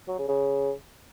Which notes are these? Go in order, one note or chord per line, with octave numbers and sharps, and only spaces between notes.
F#3
C#3
C#3